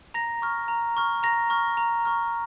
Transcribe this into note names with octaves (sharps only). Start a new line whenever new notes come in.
A#5 A#6
C#6 F6
A#5
C#6 F6
A#5 A#6
C#6 F6
A#5
C#6 F6